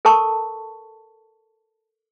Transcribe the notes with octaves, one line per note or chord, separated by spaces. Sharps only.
A4 A#4 A5 C#6